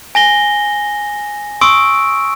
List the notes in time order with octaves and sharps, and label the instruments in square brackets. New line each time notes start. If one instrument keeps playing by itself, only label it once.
[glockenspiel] G#5 A#6 G7
C6 C#6 D#6 E6 D7